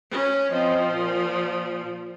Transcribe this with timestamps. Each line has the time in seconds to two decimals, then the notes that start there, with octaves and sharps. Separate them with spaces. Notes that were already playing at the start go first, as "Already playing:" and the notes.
0.11 C#4
0.52 F3 C4 C5 D#5
0.87 A#2